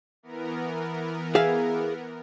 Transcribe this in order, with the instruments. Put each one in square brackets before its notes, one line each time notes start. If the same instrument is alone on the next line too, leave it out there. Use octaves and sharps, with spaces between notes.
[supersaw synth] E3 B3 A#4
[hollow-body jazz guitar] G#4 E5 F5